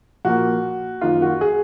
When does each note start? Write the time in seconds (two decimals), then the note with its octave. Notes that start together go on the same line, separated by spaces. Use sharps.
0.25 A#2 F3 A#3 F#4
1.01 F#2 D#3 A#3 F4
1.22 F#4
1.41 G#4